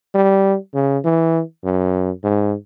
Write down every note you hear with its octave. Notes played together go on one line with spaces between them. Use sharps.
G3
C#3
E3
F#2
G#2